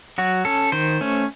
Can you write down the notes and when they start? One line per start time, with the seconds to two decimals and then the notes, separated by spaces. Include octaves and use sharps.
0.18 F#3 F#4
0.45 C#4 A4
0.72 D#3 C5
1.01 A3 C#4